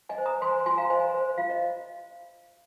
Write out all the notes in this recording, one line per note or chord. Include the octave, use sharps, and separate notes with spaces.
D#5 G#5
C5
A#5 D#6
C5 G#5 C6
F4 G#5 C6
F5 A#5
C5 D#5 G#5
C5
F4 F5
D#5